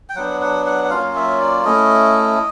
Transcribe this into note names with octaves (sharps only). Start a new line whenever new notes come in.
G5
F#3 B3 D4 F#5
F#5
F#5
F#5
F#3 A#3 C#4 F4 F5
E5
D5
A3 C#4 E4 D#5